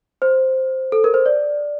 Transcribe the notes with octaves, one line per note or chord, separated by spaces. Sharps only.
C5
A4
A#4
C5
D5